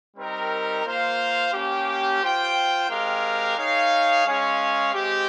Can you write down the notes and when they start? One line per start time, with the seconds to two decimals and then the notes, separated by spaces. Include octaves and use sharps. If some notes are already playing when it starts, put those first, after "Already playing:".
0.17 G3 C4 D#4 A#4
0.85 A#3 F4 C5 F5
1.52 A#3 C#4 G4
2.21 F4 C5 G5
2.89 G#3 C4 G4 A#4 F5
3.57 D#4 G#4 C#5 F5
4.25 G#3 C#4 G#4 C#5 F5
4.94 G#3 C4 G4